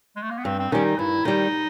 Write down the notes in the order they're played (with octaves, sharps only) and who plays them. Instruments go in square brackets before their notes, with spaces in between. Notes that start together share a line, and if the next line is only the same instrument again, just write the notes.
[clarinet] G#3
A3
A#3
B3
[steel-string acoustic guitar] G2 [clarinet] C4
[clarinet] C4
[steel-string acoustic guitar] D#3 G3 [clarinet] C#4
[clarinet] D#4
[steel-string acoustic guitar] G2 [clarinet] E4
[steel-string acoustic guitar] D#3 G3 [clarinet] D#4